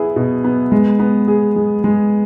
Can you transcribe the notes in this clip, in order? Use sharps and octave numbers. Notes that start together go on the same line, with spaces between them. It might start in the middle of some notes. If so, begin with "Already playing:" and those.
Already playing: B3 E4 G#4
B2
B3
G#3
B3
G#4
G#3
G#3